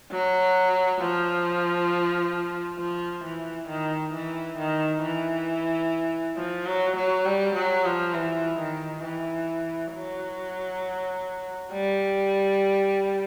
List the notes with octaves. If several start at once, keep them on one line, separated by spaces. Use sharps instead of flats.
F#3
F3
F3
E3
D#3
E3
D#3
E3
F3
F#3
F#3
G3
F#3
F3
E3
D#3
E3
F#3
G3